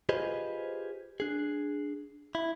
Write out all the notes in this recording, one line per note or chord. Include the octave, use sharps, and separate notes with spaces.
F4 G4 G#4 B4 C5 D#5
D4 G#4
E4